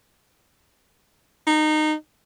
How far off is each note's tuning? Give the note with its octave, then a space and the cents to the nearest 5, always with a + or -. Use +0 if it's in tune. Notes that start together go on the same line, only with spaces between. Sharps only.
D#4 -20